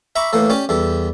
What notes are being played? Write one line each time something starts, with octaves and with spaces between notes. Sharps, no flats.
E5 A#5 B5 C#6 D6
A2 E3 A#3 A4
C#4 G4 D5 D6
E2 G3 A4